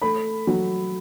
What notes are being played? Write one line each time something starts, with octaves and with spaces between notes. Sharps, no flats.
A3 B5
F#3